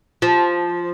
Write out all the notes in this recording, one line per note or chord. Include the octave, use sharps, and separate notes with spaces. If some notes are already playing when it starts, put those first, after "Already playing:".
F3